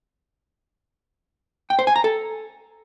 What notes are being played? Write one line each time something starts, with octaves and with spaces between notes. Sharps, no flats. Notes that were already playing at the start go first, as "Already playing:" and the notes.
G5
C5
G#5
A#5
A4